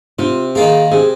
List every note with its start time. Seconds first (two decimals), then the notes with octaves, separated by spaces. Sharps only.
0.19 C3 F4
0.55 D#3 A#3 F4 G#4
0.91 C3 G#4